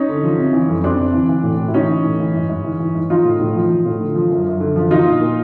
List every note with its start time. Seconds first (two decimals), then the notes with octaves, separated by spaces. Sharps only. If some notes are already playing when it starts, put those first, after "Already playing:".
Already playing: C#4 D#4
0.09 D3
0.23 F3
0.38 C3
0.53 E3
0.69 F2
0.83 F2 C4 D4
0.99 C3
1.13 E3
1.29 E3
1.44 A2
1.59 A2
1.68 E4
1.74 E3 C#4 D#4
1.89 E3
2.05 A2
2.20 E3
2.34 G#2
2.49 G#2
2.64 E3
2.80 E3
2.95 G#2
3.10 F3 D#4 F4
3.25 A2
3.40 A2
3.56 F3
3.70 F3
3.86 A2
4.00 D3
4.15 F3
4.30 F#2
4.46 F#2
4.60 D3
4.76 F3
4.91 F3 D#4 F4
5.06 A#2
5.21 A#2